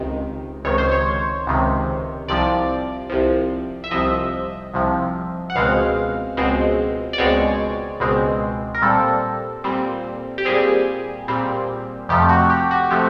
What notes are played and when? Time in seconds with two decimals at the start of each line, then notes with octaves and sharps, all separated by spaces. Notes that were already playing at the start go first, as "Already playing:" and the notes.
Already playing: C#2 C3 D#3
0.64 C#2 C3 D#3 C#5
0.78 C5
0.91 C#5
1.47 C#2 C3 D#3
2.28 C2 C3 F3 D5
3.09 C2 C3 F3
3.84 E5
3.91 C2 C3 F3 D#5
4.73 C2 C3 F3
5.50 F#5
5.55 C#2 B2 G#3 C4 F5
6.37 C#2 B2 G#3 C4
7.13 D5
7.18 C#2 B2 G#3 C4 C#5
8.00 C#2 B2 G#3 C4
8.75 A#4
8.82 A#2 G3 C4 A4
9.64 A#2 G3 C4
10.38 G4
10.45 A#2 G3 C4 G#4
11.28 A#2 G3 C4
12.09 F2 C3 F3 A3 G4
12.29 F#4
12.50 G4
12.71 F#4
12.91 C3 F3 A3 G4